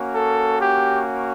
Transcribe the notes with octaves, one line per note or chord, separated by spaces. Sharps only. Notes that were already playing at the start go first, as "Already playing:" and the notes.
Already playing: A#3 C#4 F#4
A4
G4